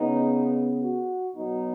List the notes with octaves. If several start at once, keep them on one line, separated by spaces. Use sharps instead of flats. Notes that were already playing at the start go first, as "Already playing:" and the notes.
Already playing: C#3 B3 D#4
F#4
B2 F#3 B3 D#4